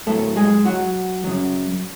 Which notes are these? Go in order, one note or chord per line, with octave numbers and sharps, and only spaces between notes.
A2 F#3 A3 A4
G#3 G#4
F#3 F#4
F#2 C#3 F#3